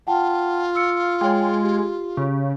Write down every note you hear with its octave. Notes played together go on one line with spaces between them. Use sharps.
F4 F#5 G5 A5
E6 C#7
G#3 C#5 G5
G4
C#3